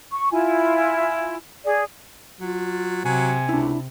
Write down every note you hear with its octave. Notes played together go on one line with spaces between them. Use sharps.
C#6
E4 F4 G#5
G#4 D5
F#3 F4
C3 F#3 G#5
C#2 D4 E4